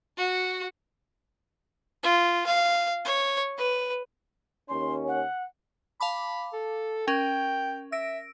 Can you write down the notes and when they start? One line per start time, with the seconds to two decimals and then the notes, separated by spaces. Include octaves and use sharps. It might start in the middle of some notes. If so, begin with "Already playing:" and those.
0.18 F#4
2.03 F4
2.46 F5
3.05 C#5
3.58 B4
4.69 D#2 C#4 C6
5.07 F#5
6.01 F5 A5 B5 D6
6.53 A4
7.08 C#4 A#4 G5
7.92 E5 E6 A#6 D7